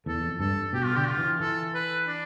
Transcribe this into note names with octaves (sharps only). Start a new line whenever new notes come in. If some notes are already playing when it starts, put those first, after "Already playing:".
E2 A4
F2
G2 A4
B2 G4
F4
D3 G4
F4
E3
E3 A4
B4
D4